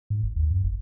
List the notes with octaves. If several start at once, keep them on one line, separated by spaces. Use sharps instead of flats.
G#2
G1
D#2
F#2
G1